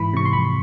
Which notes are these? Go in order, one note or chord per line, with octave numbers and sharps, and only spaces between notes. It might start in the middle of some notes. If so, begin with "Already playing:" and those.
Already playing: G#2 E3 B5
C3 C#6
C6
F2 B5